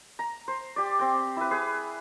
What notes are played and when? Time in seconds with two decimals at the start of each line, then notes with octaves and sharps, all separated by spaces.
0.19 A#5
0.48 C5
0.76 G4 D5
0.99 C4 G5
1.36 E4 B4
1.51 G#4 B4